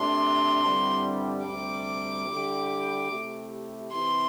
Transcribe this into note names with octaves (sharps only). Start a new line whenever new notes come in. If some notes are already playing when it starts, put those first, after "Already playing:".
Already playing: C3 A3 D4 C6
G2 D3 G3 C4 E4
D2 C3 G3 D6
D3 G3 E4 G4
C3 A3 E4 G4
C3 E3 C4 E4 G4 C6